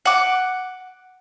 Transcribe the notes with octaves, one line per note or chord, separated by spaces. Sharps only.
F#5 D6